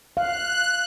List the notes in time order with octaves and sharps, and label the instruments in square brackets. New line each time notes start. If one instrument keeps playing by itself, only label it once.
[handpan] F5 [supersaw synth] F#6